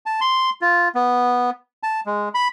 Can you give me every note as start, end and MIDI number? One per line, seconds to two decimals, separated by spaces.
0.06 0.20 81
0.21 0.50 84
0.61 0.89 65
0.95 1.50 59
1.83 2.01 81
2.06 2.29 56
2.34 2.48 83